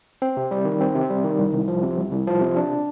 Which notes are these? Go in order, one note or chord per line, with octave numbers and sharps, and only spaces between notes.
C4
C3
G3
D#3
C4
C3
G3
D#3
C2
C2
F3
C3
C2
C2
F3
C3
D4